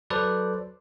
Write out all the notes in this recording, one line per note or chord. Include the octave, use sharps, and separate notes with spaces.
F#3 A4 B4 C5 D5